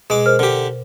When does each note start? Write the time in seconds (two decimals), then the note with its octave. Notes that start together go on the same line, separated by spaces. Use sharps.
0.10 B2 G#3 D6
0.26 A#4 C5 F6
0.39 D3 G4